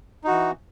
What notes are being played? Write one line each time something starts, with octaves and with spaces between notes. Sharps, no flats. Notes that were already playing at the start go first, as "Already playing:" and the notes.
E3 D#4 F#4